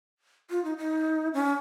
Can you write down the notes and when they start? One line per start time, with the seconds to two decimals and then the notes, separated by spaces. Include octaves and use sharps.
0.50 F4
0.64 D#4
0.78 D#4
1.34 C#4